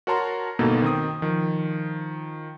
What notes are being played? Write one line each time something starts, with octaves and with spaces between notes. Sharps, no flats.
F#4 A#4 C#5 A5 A#5 C6
G1 B2 A#3 D#4 A4
D#3 C4 D#6
D#3 F3